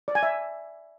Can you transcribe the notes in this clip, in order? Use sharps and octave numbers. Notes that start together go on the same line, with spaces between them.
D5
G#5
E5